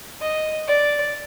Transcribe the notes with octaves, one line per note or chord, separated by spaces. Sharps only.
D#5
D5